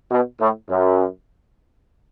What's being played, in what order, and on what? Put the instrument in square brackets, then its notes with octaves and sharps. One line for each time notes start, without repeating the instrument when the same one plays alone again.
[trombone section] B2
A2
F#2